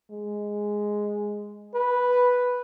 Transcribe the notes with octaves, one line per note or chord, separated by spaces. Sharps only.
G#3
B4